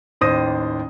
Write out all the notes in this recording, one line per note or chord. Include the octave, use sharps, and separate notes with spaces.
A1 D#2 C5 D#6 A#6 D#7